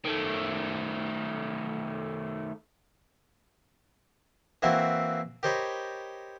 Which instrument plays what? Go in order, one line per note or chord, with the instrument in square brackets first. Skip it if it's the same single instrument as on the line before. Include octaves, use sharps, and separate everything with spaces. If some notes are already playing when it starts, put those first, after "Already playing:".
[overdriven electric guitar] D#3 A3
[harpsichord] E3 A#3 C4 E4 F#4 E5
G4 A#4 C5 C#5 D#5 B5